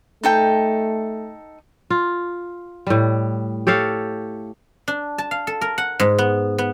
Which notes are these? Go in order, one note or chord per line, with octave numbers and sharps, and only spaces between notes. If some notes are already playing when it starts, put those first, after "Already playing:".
A3 D#4 A4 G5
F4
A2 G3
G4 A4 C#5 F5
D4
A5
F5
A4
A#4
F#5
G#2
B3
B3